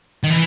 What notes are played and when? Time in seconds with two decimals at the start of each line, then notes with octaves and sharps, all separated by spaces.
0.24 D#3
0.30 E3